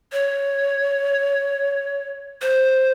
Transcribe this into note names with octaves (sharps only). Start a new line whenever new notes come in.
C#5
C5